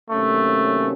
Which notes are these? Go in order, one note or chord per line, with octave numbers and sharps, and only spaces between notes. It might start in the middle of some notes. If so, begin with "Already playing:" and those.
C3 D#3 F#3 A3 A#3 C#4